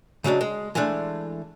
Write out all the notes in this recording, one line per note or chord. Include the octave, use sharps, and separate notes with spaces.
C#3 F#3 G#3 C4 D4
G#3
E3 G#3 A3 D4